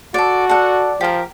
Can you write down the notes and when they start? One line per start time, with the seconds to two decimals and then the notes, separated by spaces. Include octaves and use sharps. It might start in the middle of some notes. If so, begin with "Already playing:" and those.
0.14 F#4 A4 D5
0.49 A4 D5 F#5
1.01 F3 G4 A#4